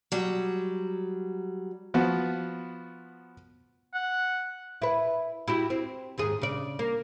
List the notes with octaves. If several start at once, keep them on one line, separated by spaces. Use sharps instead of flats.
F#3 G3
F3 B3 F#4
F#5
E4 B4
E4 F#4 G4
C4
D#2 G#2 G#4
C#3 D5
A#3